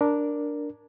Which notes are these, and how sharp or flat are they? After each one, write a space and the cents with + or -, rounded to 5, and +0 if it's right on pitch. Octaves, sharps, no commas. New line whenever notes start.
D4 +0 A#4 +0